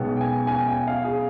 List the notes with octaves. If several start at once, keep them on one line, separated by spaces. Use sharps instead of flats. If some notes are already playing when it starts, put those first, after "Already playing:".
Already playing: B1 B2 G#3 B3 G5
G5
G#5
G#5
G5
G5
G#5
F5
G#4